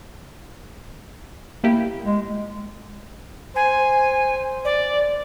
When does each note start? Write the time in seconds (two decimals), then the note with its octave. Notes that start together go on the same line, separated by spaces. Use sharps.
1.64 A#3 E4 G4
2.05 G#3
3.56 C5 G#5
4.65 D5